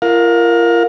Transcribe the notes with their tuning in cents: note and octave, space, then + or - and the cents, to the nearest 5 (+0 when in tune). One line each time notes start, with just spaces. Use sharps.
F4 -40 A#4 +0 F5 +30